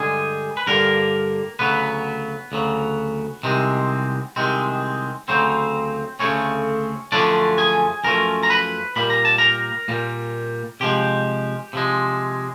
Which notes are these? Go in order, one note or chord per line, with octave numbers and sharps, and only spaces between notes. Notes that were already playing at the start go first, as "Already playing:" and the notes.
Already playing: G2 D3 G3 G#3 G#4
B4
G2 D3 G3 A#3 A#4
D2 C#3 F#3 B3 B4
D2 C#3 F#3
C2 C3 D#3 G#3 C4
C2 C3 D#3 G#3 C4
D2 C#3 F#3 C4 C5
D2 C#3 F#3 A3 C4 C#4 C#5
F#2 D3 F3 A3 C#4 D4 D5
G#4 G#5
F#2 D3 F3 A3 C#4 A#4 A#5
A#5
B4 B5
A#2 G3 A#3 B5
A#5
A5
A#4 A#5
A#2 G3 A#3
C3 F3 G#3 G4 G5
C3 F3 G#3